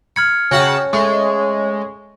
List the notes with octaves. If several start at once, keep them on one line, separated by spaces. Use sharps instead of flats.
B5 F6 G#6 C#7
C#3 C#4 F#4 F#5 G5 A5
G#3 A3 C#6